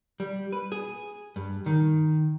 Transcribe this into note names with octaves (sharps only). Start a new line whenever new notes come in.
G3
B4
G#4
G2
D#3